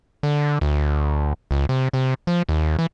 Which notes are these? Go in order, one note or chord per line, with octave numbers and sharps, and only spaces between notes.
D3
D2
C#2
C3
C3
F3
D#2
E3